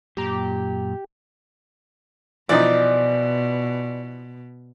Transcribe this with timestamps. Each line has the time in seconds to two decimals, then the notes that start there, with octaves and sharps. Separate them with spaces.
0.17 F#2 A#2 G4 A#5
2.49 B2 E3 F3 D#4 D5